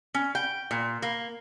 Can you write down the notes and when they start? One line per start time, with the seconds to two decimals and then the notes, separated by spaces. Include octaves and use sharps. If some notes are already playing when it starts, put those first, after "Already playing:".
0.14 C#4
0.35 G5
0.71 A#2
1.02 A#3